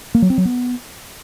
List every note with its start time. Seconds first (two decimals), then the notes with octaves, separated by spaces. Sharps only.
0.15 A#3
0.22 F#3
0.30 C4
0.38 F#3
0.45 B3